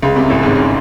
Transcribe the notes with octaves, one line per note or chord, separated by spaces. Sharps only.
C#2 C#3
C2 C3
A1 A2
G#1 G#2
G#2